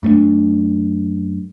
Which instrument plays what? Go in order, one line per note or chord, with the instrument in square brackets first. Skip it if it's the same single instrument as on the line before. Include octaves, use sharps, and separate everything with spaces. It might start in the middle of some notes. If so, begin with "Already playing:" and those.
[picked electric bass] F#2 A3 A#3 D4